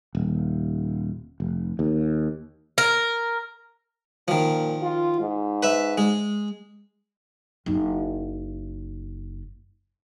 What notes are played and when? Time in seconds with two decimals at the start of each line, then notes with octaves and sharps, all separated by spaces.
0.15 D#1
1.40 F1
1.79 D#2
2.78 A#4
4.28 A#2 D#3 F3
4.82 F4
5.20 G#2
5.63 B4 E5
5.98 G#3
7.66 F#1 D#4